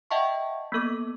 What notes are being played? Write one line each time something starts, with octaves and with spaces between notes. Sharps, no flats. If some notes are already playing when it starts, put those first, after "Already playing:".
D#5 E5 F#5 G5 A5 C#6
A#3 B3 A4 D6